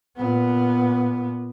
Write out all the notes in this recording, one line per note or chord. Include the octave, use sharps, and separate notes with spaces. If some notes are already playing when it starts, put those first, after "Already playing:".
A#2 B3